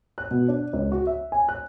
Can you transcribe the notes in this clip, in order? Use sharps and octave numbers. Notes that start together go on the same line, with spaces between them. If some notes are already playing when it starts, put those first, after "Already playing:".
F#6
B2
D4
C#2
F#4
E5
G#5
F#6